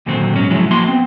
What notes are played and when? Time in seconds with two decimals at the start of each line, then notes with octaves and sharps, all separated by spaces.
0.06 D#2 A#2 D3 F#3 C4
0.35 G#2 F#3 C#4
0.50 C#3 F3 F#3 G#3 E4
0.70 F3 A#3 F#4 C6
0.88 B3 C4